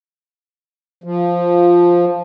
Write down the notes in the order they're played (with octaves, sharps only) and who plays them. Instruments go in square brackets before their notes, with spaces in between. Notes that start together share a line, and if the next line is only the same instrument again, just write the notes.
[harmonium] F3